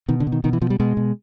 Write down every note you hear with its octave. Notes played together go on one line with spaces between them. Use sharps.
B2 D#3
D3
B2
D#3
B2 D#3
E3
B2 F3
G3
B2 G#3
B2